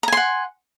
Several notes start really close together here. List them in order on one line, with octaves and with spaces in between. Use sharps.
A#5 G#5 C6 F#5